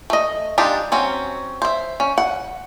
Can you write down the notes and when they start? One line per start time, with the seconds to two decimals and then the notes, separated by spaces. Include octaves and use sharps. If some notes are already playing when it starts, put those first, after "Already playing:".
0.10 A3 D#5
0.58 G#3 D4 D#4 F4 G4
0.92 F#3 C4 C#4
1.62 C5 E5
2.00 C#4
2.18 F#5